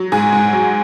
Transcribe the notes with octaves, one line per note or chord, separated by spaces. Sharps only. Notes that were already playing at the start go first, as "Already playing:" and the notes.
Already playing: F#3
G#2 G#4
G#2
F#3